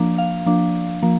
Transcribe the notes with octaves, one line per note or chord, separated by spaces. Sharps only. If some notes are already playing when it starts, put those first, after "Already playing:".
Already playing: F3 A#3 D4
F5
F3 A#3 D4
F3 A#3